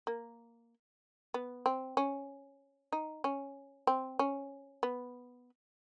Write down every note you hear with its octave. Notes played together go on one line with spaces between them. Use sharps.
A#3
B3
C4
C#4
D#4
C#4
C4
C#4
B3